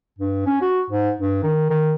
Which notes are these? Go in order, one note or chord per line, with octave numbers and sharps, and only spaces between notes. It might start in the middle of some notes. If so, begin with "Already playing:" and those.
G2
C#4
F#4
G#2
G2
D#3
D#3